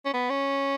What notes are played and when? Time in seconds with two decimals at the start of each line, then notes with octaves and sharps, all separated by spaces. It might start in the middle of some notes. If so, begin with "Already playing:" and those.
0.06 C#4
0.14 B3
0.30 C#4